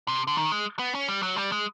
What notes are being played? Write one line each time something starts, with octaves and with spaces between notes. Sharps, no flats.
C3
D3
D#3
G#3
B3
C#4
G3
F#3
G3
G#3